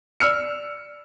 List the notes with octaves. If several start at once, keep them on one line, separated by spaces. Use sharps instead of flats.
D5 E6 F6 C#7